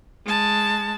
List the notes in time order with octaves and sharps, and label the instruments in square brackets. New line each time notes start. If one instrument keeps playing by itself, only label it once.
[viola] G#3 A5